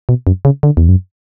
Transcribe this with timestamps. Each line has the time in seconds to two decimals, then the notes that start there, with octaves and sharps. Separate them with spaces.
0.09 B2
0.27 F#2
0.45 C#3
0.63 D3
0.77 E2
0.88 F#2